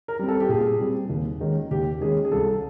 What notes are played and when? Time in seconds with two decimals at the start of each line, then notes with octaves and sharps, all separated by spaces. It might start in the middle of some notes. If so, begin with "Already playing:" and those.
0.08 A#4
0.19 G3 C4
0.28 A4
0.40 G4
0.49 A#2 G#4
0.80 G3 C4
1.09 D#2
1.40 D#3 G#3 C#4
1.71 D#2 G4
2.01 D#3 G#3 C#4 G#4
2.25 G#4
2.32 C2 A4